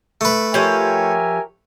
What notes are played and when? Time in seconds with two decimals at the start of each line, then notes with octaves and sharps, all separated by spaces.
0.21 A3 B4
0.54 F3 G4 A#4 C#5 E5 G#5